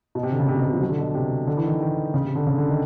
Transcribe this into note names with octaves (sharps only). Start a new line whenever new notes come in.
B2
C3
D3
C#3
C3
B2
C3
F3
F#3
D3
B2
C3
D3
E3
D#3
D#3
C#3
C3
D3
C#3
D3
D#3